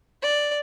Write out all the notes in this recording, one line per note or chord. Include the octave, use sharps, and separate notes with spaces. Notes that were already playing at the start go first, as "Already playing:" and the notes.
D5